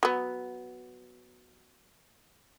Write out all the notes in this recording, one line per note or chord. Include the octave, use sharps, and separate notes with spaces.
F#3 B3